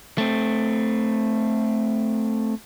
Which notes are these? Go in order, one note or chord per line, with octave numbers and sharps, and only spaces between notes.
A3 C4